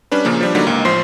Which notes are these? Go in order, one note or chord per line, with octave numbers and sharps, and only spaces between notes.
G3 C#4 D4 B4
A#2 C#3 F3 A#3
F3 G3 D4
D3 F#3 G3 A#3 D4 D#4
C#2 G#2 A#3
A1 F3 C5 C6 C7